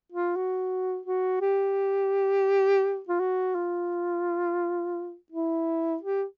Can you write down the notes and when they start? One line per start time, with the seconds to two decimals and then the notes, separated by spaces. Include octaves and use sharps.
0.12 F4
0.36 F#4
1.06 F#4
1.42 G4
3.09 F4
3.20 F#4
3.55 F4
5.32 E4
6.03 G4